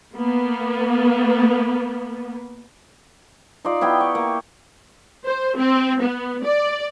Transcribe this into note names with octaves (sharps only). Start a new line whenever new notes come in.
A#3 B3
D#4 F4 D5
B3 E4 G4 G5
C#6
A#3
C5
C4
B3
D5